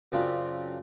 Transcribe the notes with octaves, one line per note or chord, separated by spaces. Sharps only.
F#2 C#3 C4 D4 F4